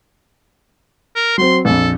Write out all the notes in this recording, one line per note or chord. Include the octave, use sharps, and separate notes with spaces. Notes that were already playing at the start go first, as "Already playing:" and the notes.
A#4
F#3 C4 C6
A#1 F2 A4